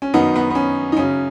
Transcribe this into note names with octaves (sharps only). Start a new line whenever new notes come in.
C#4
F#2 D#3 B3 D#4
B3
B3
C#4
D#4
F#2 C#3 C#4